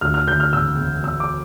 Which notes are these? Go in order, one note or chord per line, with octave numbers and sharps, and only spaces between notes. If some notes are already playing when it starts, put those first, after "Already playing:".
D2 F6
F6
D2 G6
F6
E1 E6
E1
E1 E6
D6